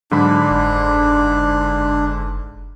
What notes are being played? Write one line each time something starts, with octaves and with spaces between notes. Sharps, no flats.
G#2 D3 F#3 D4 B5
F#1